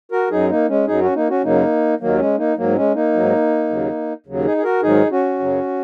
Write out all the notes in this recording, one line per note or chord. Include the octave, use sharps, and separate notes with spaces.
F#4 A#4
F#2 F#3 D#4 G#4
A#3 D#4
G#3 C#4
F#2 F#3 D#4 G#4
C#4 F#4
A#3 D#4
C#4 F#4
F#2 C#3 F#3 A#3 D#4
D#2 D#3 F#3 A#3
G#3 C#4
A#3 D#4
G#2 F#3 A#3
G#3 C#4
A#3 D#4
G#2 F#3
D#2 C#3 F#3
D#2 C#3 F#3
D#4 G#4
G#4
F#4 A#4
G#2 D#3 F#3 D#4 G#4
C#4 F#4
F#2 C#3 F#3